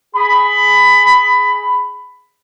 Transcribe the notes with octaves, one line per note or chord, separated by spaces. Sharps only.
G#4 B5